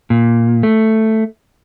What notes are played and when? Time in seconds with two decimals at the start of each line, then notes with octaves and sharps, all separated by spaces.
0.10 A#2
0.63 A3